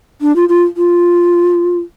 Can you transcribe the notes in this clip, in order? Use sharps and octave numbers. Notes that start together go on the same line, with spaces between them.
D4
F4
F4
F4